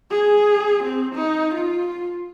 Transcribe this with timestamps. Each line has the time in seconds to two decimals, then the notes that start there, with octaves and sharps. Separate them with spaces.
0.11 G#4
0.84 C4
1.15 D#4
1.55 F4